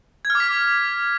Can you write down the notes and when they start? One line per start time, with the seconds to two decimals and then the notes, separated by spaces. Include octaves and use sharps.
0.25 G#6
0.30 F6
0.35 D6
0.40 B6